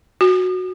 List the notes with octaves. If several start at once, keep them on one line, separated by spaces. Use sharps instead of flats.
F#4